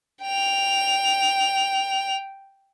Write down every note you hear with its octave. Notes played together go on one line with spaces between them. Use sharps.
G5 F7